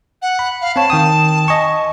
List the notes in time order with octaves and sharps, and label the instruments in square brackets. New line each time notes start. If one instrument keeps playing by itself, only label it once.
[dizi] F#5
[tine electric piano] B5
[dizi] F5
[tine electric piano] C4 C#5 [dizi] A5
[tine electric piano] D#3 G5 D#6
D#5 G#5 C#6